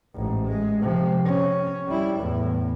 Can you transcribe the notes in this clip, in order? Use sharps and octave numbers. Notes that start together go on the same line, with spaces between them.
A1 G#2
G#3
C3 F3
C#4
G3 E4
E2 A2